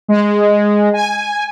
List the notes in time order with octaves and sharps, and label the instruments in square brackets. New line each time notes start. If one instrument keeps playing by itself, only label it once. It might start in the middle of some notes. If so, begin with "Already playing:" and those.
[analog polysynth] G#3
G#5